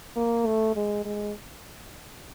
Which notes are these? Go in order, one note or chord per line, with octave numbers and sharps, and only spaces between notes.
A#3
A3
G#3
G#3